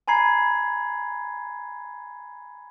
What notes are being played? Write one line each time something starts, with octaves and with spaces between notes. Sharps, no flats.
G#5 A#5 B5 G#6 C7